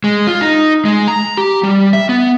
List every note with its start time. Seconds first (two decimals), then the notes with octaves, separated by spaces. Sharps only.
0.04 G#3
0.27 F4
0.41 D#4
0.85 G#3
1.08 A#5
1.37 G4
1.63 G3
1.93 E5
2.09 B3